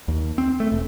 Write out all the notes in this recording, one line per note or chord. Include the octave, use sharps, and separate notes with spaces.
D#2
C4
A3
E1